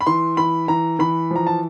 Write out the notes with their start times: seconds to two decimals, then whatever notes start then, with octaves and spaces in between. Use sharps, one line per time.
0.01 B5
0.06 E3 C6
0.37 E3 B5
0.68 E3 A#5
0.99 E3 B5
1.31 F3 A#5
1.47 A5